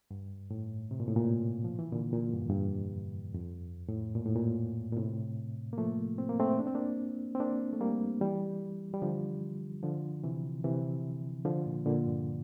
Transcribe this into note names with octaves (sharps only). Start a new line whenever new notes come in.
G2
A2
C3
A#2
A2
A#2
F3
E3
A#2 D3
A#2
G2
F2
G2
F2
A2
A#2
A2
A#2
A#2
A2 C3
A#3
F3 A3
C4
A#3
A3 C4
D4
C4
A#3 D4
C4
A#3 D4
A3
G3 A#3
E3 G3
G3
D3 F3
D3 F3
C3 E3
C3 E3
D3 F3
A#2
A#2 D3
G2